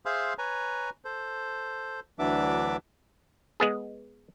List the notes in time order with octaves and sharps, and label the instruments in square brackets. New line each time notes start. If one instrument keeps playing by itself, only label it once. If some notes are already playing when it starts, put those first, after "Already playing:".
[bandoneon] G#4 C5 E5 F5 C6
B4 C#5 G#5 A#5
A4 C5
D2 E3 F#3 D4 E5 D6
[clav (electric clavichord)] G#3 B3 G#4